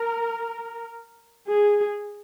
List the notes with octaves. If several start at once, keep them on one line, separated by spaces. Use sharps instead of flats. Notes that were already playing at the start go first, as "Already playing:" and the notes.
Already playing: A#4
G#4